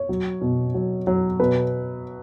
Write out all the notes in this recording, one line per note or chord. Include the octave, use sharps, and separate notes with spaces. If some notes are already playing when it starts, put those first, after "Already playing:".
Already playing: C#5
F#3
B2
F#3
F#3
B2 B4